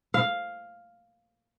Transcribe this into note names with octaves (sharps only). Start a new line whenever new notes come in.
F5